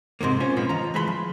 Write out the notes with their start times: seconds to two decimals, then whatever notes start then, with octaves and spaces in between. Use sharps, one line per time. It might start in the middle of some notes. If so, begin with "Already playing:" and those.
0.21 G#2 C3 D#3 A#3
0.40 C#4 F4 C5
0.57 G#2 B2 F3 B3
0.69 D#3 F4 A#5
0.94 E3 G#3 A3 B4 B5 C6
1.07 F3